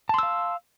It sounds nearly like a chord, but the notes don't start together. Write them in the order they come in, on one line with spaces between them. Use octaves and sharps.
A5 C6 E6 F5